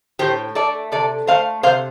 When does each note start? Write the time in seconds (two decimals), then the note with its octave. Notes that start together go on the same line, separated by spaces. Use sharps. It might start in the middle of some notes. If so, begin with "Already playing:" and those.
0.19 A2 G4 C5
0.55 A3 A4 D5
0.92 C3 A4 D5
1.27 A3 C5 F5
1.63 C3 C5 F5